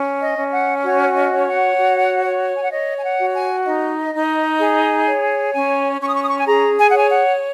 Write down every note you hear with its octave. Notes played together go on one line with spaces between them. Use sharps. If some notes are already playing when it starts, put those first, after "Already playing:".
Already playing: C#4
D#5
C#4
F#5
F#4 C#5
D#5
C#5
F#5
F#4
C#5
G#5
F#5
C#5 D#5
G#5
F#5
F#4
G#5
D#4 D#5
D#4
G#4
C#5
C#4 G#5
C#4 C#6
D#6
C#6
D#6
C#6
G#5
G#4 A#5
G#5
F#5
C#5 G#5
F#5